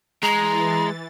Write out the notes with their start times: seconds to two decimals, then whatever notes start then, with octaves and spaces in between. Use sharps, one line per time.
0.23 E3 G#3 A#5 A6